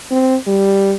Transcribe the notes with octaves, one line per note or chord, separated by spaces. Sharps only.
C4
G3